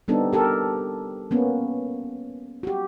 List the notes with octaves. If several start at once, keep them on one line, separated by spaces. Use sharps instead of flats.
G3 B3 C4 D4 D#4 A4
G4 A4 A#4
A#3 B3 C#4
F#4 G4